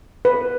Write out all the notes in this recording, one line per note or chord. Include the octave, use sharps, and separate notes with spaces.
B4